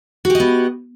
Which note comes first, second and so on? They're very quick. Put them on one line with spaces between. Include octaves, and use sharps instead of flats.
F#4 G4 D#5 B3